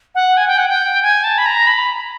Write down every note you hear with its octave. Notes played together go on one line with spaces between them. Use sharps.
F#5
G#5
G5
F#5
G5
G#5
A5
B5
A#5
B5